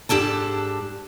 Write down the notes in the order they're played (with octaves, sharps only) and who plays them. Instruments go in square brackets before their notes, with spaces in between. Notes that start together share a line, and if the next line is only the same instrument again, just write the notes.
[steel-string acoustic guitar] G#2 D4 G4 A4 A5